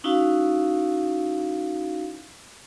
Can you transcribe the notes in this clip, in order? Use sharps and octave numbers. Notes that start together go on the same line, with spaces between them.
C#4 D#4 E4 F#4 F5